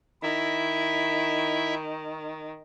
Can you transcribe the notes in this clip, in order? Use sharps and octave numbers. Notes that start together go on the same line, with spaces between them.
D#3 E4 E5